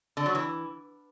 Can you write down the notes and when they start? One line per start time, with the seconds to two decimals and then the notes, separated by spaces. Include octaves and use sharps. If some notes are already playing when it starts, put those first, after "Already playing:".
0.17 D3
0.26 F#3
0.35 E3